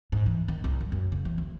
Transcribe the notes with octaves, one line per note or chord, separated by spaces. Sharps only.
G#2
E3
D#3
C2
G2
F#2
C#3
E3
D2